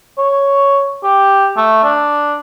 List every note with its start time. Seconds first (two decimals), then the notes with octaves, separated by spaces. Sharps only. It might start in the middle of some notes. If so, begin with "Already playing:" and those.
0.18 C#5
1.03 G4
1.57 A3
1.84 D4